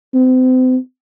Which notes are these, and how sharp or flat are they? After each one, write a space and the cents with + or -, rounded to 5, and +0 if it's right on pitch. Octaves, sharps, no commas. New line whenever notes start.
C4 -35